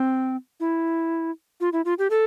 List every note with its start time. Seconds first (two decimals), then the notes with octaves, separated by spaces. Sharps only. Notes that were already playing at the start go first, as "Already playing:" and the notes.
Already playing: C4
0.60 E4
1.61 F4
1.73 E4
1.85 F4
1.99 G4
2.10 A4